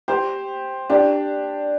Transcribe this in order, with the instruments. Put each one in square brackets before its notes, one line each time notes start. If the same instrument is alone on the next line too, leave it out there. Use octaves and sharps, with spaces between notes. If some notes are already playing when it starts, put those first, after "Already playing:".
[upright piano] G4 C5
D4 G4